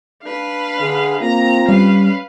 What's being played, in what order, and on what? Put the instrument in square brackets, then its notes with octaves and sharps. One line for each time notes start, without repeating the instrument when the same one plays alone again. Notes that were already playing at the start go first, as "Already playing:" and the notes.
[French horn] D4 [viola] B4 F5
[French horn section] D3 [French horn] G#4
[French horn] A#3 [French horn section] C4 F4 [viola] A#5
[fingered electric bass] G3 [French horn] C#4 [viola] B4 F5